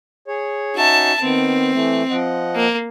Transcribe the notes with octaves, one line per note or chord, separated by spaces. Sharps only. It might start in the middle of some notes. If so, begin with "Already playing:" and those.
G#4 C#5
C#4 D#4 F#4 E5 A5
D#3 B3 C4
E3 A3
F3 D#5 F#5
A#3